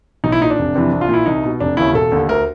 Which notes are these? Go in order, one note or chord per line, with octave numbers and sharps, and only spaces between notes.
B1 D#4
E4
A#2 D#4
D4
F1
F2 C3 E3
C2
F4
A#2 E4
C2 D#4
B2
F1 D4
D#2 C#3 E4
E1 A4
D#2 D3
D2 A#4